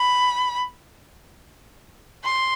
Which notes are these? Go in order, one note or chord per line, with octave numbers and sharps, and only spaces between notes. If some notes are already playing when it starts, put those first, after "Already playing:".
Already playing: B5
C6